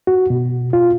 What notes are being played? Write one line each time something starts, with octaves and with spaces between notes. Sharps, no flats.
F#4
B2
F4